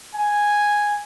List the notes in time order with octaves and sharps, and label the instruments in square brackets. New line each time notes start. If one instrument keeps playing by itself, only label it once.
[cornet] G#5